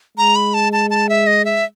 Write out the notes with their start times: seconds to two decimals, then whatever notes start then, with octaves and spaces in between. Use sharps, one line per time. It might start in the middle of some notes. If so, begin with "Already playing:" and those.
0.17 G#3 A#5
0.36 B5
0.54 A5
0.73 A5
0.90 A5
1.09 E5
1.27 D#5
1.45 E5